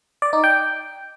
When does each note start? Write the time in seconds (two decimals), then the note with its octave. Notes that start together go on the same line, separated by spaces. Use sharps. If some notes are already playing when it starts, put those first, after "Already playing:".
0.22 D5
0.33 D#4
0.44 G5